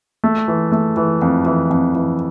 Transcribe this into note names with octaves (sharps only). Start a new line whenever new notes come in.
A3
E3
A3
E3
F2
E3
F2
E3